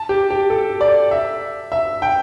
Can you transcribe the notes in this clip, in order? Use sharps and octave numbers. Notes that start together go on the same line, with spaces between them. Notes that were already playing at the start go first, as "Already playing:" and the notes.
Already playing: A5
G4
G4
A4
D5
E5
E5
G5